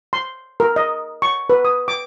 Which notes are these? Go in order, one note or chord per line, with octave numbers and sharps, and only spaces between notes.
C6
A#4
D#5
C#6
B4
D#6
D6